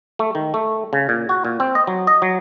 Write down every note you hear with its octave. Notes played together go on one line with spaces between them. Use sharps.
A3
D#3
A3
C#3
A#2
F#4
A#2
C4
D#5
F#3
D#5
F#3